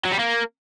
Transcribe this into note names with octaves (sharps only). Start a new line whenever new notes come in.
F#3
G3
A#3